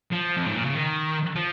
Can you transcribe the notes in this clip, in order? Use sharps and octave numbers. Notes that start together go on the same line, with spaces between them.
F3
F2
G#2
A#2
C#3
D#3
F3